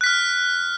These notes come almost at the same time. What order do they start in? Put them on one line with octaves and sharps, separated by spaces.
F#6 B6 F6